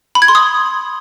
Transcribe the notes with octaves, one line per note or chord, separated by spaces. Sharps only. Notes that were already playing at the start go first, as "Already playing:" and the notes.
B5
G#6
C6
D#6